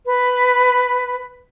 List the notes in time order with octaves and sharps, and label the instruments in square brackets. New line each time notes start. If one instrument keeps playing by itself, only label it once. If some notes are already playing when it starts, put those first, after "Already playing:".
[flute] B4